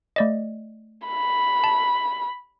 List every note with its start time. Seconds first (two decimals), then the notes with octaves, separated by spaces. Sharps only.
0.16 A3 D5 D#5
1.08 B5
1.64 A5